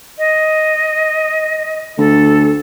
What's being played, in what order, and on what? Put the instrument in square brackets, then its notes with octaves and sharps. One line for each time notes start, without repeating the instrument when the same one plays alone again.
[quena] D#5
[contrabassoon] D2 [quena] A4